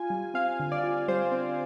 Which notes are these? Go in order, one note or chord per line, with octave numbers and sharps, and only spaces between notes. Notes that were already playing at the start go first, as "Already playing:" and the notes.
Already playing: F4 G#5
G3
C4 F5
D3
D5
F4
G3 C5
C4